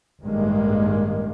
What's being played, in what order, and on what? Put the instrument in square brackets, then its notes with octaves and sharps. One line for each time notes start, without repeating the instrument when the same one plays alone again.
[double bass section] A1 G2 D#3 G#3 A#3